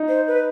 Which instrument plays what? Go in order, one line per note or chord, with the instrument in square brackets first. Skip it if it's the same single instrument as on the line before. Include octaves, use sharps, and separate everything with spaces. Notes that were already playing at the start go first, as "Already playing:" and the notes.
Already playing: [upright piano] D#4
[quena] C5
B4